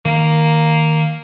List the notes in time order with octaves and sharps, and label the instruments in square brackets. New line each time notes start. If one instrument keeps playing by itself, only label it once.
[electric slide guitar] D#3 A#5 [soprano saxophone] A#3